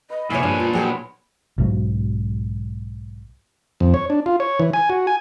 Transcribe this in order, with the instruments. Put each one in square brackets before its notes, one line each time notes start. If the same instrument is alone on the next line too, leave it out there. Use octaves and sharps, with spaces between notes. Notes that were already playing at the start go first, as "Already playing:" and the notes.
[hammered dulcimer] B4 [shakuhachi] D#5
[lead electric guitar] C2 A#2 [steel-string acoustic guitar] E4 C#5 [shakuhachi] G#5
[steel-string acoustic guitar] G2 [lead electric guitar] A#2 D4
[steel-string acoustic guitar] F4
[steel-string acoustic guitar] F#3 F#4 G5 [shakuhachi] G#4 [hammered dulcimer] F#5 B5
[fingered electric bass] B1 G#2 F#3
[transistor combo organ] F2
C#5
D4
F4
C#5
E3
G#5
F#4
G#5